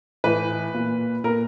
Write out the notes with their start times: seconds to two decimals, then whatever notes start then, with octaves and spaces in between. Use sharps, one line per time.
0.24 A2 E3 B4
0.74 A#2
1.24 A#2 A#4